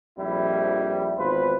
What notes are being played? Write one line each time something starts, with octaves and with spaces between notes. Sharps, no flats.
A#1 F2 G3 E4
G#1 E2 F4 B4 C5